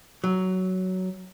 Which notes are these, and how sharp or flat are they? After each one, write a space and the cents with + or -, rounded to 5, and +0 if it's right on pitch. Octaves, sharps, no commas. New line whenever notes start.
F#3 +10